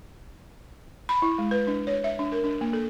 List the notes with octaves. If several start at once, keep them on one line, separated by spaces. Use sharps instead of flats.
B5
E4
G#3
B4
D4
C#5
E5
D4
A#4
D4
A#3
A4